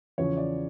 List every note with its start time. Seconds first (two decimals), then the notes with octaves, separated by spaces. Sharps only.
0.18 E2 C#3 F3 C#5
0.37 D5